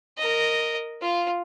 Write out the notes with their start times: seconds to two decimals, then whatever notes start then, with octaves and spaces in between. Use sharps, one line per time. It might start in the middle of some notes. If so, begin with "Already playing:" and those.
0.18 A#4 D#5
1.02 F4 F5